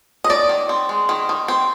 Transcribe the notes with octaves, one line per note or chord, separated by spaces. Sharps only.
D#5
D#3 D5
D#3
C4
G#3
D#3
D#3
C4